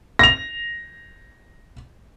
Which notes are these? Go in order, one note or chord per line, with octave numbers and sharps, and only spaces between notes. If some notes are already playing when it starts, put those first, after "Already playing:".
A#6 F7